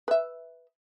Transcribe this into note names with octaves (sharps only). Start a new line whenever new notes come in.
B4 E5